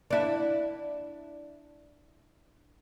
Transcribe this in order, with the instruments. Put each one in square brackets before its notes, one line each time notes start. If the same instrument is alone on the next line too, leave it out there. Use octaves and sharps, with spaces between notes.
[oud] D4 E4